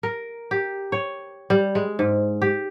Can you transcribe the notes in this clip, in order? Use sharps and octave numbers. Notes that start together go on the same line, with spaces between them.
A#4
G4
C#5
G3
G#3
G#2
G4